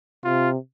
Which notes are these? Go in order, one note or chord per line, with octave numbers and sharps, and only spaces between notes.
C3 F4